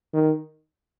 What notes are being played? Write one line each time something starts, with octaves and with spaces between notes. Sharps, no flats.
D#3